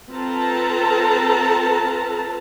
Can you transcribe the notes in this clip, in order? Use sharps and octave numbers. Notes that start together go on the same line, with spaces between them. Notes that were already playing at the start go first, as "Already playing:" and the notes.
C4 F4 A4 B4 A5 A#5